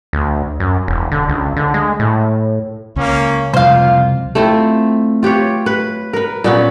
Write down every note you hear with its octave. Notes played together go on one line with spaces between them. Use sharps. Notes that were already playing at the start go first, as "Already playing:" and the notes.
D2
F#2
E1
D3
C#2
D3
G#3
A2
C#2 A#3 C#4
C2 F2 A#3 F4 C5 F5
A3 C4 E4 F4
F4 G4 B4 C#5
B4
A#4 B4
A#2 B3 C#4